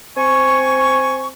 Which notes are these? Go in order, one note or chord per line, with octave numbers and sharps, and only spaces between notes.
C4 G#5 C#6